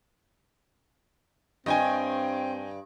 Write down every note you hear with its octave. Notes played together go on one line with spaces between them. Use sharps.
G2 C4 D#5 G5 G#5